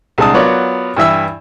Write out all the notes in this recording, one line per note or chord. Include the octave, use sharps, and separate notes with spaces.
C2 G#3 D4 A5 D#6
F#3 B3 F4 A#4 C#5 D5
G2 E3 E5 E6